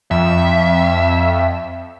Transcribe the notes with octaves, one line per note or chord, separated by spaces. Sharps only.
F2 E5